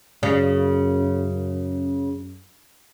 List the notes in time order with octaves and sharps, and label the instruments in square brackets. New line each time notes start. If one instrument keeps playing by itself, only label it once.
[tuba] F#2 [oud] C#3